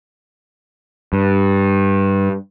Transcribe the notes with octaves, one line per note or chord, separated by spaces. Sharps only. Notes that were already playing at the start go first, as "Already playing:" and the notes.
G2